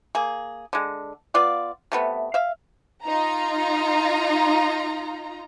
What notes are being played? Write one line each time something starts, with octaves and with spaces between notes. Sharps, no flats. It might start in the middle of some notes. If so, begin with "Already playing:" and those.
A#3 G#4
D3 G#3
B3 F4 D5 F5
C3 A3 B3
E5 F5
D#4 F4 A#5